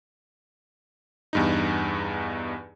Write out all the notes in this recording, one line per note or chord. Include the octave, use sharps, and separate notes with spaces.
E2 G2 D#4